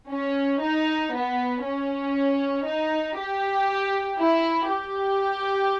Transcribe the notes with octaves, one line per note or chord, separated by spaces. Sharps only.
C#4
D#4
B3
C#4
D#4
G4
E4
G4